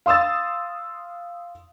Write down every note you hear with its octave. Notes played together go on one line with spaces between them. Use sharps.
F5 C6 D#6 E6 A6